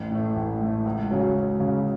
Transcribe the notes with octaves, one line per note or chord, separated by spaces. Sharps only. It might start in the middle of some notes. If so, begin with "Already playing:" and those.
Already playing: A1
A2 A3
A1
A2 A3
C#2
C#3 F#3 C#4
C#2
C#3 F#3 C#4